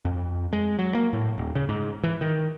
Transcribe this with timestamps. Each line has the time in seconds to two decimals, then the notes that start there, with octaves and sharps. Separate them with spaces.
0.05 F2
0.53 G#3
0.79 F#3
0.95 A#3
1.13 A2
1.38 D#1
1.55 C#3
1.69 G#2
2.04 E3
2.21 D#3